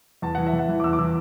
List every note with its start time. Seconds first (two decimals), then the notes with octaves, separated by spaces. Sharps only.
0.22 E2 A5
0.35 E3 F#5
0.46 E5
0.53 E2
0.59 F#5
0.69 E3
0.80 D6
0.83 E2 E6
0.93 D6
0.99 E3 E6